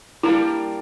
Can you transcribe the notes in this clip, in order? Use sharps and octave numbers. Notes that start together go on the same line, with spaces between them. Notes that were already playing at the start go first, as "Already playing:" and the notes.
G3 A#3 D4 E4 A#4